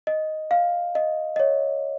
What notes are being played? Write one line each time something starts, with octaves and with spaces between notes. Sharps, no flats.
D#5
F5
D#5
D#5
C#5